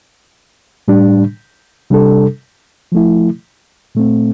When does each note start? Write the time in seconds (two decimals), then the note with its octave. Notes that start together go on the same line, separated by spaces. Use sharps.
0.88 A2 G3 D4
1.90 C3 G3 D4 A4
2.92 F3 A3 E4
3.95 A#2 A3 C4